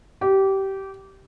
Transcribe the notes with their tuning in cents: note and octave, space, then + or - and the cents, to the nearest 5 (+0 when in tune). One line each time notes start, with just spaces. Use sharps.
G4 -20